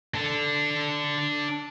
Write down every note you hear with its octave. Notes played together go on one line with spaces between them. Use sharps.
D4 A4